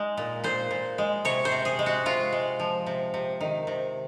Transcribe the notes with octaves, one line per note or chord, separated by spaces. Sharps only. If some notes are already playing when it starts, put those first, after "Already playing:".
Already playing: G#3 D#4
A#2
A#2 C5
A#2
G#3
C3 C#5
C5
C3
G#4
G#3
F#4
C3 F4
G#3
F3
C3
C3
D#3
C3